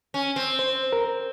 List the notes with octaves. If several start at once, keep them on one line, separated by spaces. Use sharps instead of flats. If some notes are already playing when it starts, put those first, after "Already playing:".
C#4
C4
C5
A#4